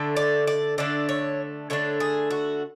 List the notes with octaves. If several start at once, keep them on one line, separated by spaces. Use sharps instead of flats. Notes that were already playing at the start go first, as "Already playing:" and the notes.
Already playing: D3 A3 D4
D5
D5
D3 A3 D4 D5
C#5
D3 A3 D4 C#5
G#4
F#4